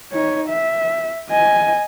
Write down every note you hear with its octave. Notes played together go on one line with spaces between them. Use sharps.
D#4 C#5
E5
D#5 G#5